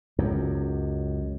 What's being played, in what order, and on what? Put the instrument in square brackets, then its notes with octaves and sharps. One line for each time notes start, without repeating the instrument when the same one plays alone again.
[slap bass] C#2 F#2